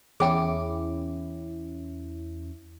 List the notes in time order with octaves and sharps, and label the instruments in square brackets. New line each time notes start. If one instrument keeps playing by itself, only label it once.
[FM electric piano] E2 C#4 E4 [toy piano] G#4 G5 [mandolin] D6